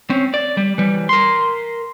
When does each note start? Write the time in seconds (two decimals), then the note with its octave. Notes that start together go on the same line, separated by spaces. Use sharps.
0.10 C4 C#4
0.34 D5
0.57 G3
0.78 E3 G3
1.09 A#4 C6